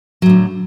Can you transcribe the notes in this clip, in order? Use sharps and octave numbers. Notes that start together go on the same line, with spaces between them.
A2 D3 F#3